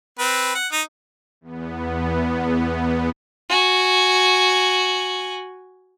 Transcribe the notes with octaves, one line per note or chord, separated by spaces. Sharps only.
C4 B4
F#5
D#4
E2 B3
F#4 G#5